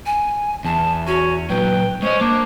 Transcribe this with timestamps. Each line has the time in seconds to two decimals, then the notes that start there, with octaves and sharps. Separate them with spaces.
0.06 G#5
0.65 E2 A5
1.07 C#4 F#4
1.50 A#2 F#3 B4 G5
2.02 G#3 C#4 C5 D#5
2.21 A#3 D4